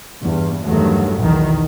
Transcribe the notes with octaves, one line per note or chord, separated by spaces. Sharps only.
E2 G2
E2 G2 D#3 F#3 A3
B1 E2 D#3